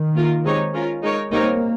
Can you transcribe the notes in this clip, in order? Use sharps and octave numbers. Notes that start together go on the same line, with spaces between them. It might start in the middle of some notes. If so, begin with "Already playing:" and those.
Already playing: D#3
A#3 F4 A#4
G#3 C4 D#4 G4 C#5
C#4 F4 A#4
G#3 D#4 A#4 C#5
G3 A#3 C4 D#4 A#4 C#5